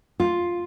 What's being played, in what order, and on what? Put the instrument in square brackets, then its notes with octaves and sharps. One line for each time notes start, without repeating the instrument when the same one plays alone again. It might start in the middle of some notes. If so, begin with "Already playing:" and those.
[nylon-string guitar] F4